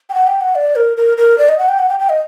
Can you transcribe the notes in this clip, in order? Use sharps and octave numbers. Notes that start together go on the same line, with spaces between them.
G5
F#5
G5
F#5
D5
A#4
A#4
A#4
D5
D#5
F#5
G5
F#5
G5
G5
D#5